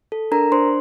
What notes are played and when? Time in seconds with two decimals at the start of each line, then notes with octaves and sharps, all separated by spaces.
0.12 A4
0.32 D4 A#4 A#5
0.52 D4 C5 C6